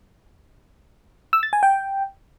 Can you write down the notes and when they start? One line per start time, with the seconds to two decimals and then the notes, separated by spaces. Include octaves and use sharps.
1.33 E6
1.43 A6
1.53 G#5
1.63 G5